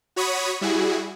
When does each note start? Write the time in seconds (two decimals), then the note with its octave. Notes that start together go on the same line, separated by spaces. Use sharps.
0.16 F#4 C#5 B5 C#6 D#6
0.61 G3 E4 F#4 G#4